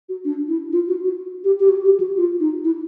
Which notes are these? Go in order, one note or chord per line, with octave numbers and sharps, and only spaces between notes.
F#4
D4
E4
F4
F#4
F#4
G4
G4
F#4
G4
F#4
F4
D#4
E4